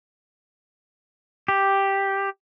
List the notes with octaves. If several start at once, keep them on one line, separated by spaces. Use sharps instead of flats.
G4